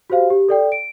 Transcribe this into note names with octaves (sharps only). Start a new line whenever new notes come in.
F#4 G4 C5 F5
G4
A4 D5 G5
D7